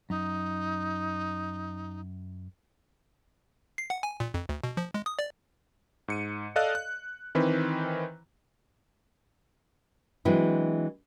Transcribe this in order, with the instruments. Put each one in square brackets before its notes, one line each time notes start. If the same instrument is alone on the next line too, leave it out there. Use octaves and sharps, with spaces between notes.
[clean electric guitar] F#2 [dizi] D#4
[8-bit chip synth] C7
F#5
G#5
A#2
F2
D2
B2
F3
G#3
D#6
D5
[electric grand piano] G#2 C#7 D#7
A4 D5 D#5 F5 F#6
F#6
D#3 E3 C4 B4
[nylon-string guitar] E3 F#3 G#3 C4 D4 E4